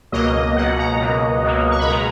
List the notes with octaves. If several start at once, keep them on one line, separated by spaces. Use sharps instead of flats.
C#2 B2 F#3 A#3 D#5
C#2 B2 F#3 A#3 F#5
A#5
C#2 B2 F#3 A#3
C#2 B2 F#3 A#3
C#6
B5
B2 G#3 A#5